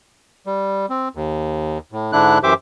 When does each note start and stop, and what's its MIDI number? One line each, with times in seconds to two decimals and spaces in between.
0.46 0.86 55
0.90 1.08 60
1.15 1.78 39
1.92 2.12 45
2.13 2.38 44
2.13 2.38 50
2.13 2.38 62
2.13 2.38 64
2.13 2.38 90
2.43 2.54 42
2.43 2.54 52
2.43 2.54 67
2.43 2.54 72
2.43 2.54 76
2.43 2.54 86